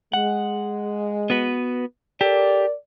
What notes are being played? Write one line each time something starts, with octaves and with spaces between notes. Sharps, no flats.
G#3 F#5
B3 F#4 B4
G4 A4 A#4 D5